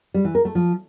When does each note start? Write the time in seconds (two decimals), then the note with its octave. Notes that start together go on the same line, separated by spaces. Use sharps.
0.14 G3
0.25 E3
0.35 A#4
0.45 A3
0.55 F3